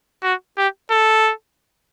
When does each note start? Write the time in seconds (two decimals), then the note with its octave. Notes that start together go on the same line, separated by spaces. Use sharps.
0.23 F#4
0.57 G4
0.91 A4